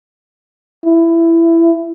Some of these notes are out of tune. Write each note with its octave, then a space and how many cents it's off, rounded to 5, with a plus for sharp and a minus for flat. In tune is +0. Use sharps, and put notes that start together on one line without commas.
E4 +15